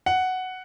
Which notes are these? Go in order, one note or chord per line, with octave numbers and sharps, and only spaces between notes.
F#5